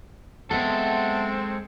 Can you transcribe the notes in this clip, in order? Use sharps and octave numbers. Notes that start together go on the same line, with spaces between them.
G#3 B3 C4 A4 E5 F#5 A5